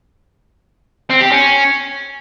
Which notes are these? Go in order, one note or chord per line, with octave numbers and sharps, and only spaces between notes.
C4
G4
C#4